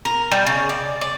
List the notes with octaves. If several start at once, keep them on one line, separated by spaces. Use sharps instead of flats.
A#4
G3
C#3
D5
D5